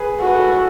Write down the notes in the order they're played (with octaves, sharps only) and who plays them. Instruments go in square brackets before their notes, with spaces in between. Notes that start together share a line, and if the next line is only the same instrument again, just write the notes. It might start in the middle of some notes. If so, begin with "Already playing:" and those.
Already playing: [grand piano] G#4 B4
[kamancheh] F#4 [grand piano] A4
[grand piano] B4
A4
B4
A4